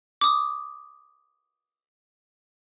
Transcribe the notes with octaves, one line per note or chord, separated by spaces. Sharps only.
D6 D#6